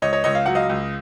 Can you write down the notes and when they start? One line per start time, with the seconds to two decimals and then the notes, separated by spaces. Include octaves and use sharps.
0.02 C#2 C#5 D#5
0.13 C#5 D#5
0.24 C#2 C#5 D#5
0.35 F5
0.46 F#3 F#5
0.55 D#5 F5
0.69 C#2